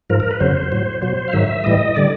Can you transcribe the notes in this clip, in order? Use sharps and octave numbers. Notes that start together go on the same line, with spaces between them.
G#2 F3 A#4
A#4
B4
F2 C#3 F#3 C5
A2 F#3
B2 F#3 C5
F5
G#2 D#3 F#3 E5
A2 E3 G3 D#5
D3 G3 D5